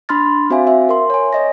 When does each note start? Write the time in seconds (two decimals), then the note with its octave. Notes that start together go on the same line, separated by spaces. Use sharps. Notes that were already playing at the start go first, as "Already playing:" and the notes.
0.09 D4 B5 C6 F6 A6
0.50 C4 F#4 C5 E5 F5 G#5
0.67 E5
0.89 A#4 C6
1.10 C#5 G#5
1.33 C#5 D#5 A#6